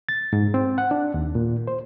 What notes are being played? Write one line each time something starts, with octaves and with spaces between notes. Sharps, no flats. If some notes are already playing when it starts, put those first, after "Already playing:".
A6
G#2
C4
F#5
D4
D#2
A#2
C5